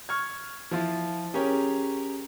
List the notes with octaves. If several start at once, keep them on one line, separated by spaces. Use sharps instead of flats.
C#6 F6 G#6
F3 E4 F4
C#4 G4 G#4 A#4 C#5